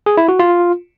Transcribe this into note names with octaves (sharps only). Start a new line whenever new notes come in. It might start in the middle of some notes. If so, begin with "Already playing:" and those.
G#4
E4
F#4
F4